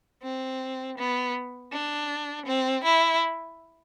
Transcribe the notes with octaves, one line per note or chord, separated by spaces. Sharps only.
C4
B3
D4
C4
E4